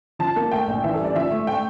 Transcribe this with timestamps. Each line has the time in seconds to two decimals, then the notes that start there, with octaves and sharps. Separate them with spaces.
0.19 F3 A5
0.36 A#3
0.52 A3 G5
0.68 A#1
0.83 E3 E5
0.94 A4
0.99 G3
1.04 D5
1.15 F3 E5
1.31 A3
1.47 A3 G5